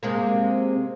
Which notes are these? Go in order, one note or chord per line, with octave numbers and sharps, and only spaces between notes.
C3 G#3 A#3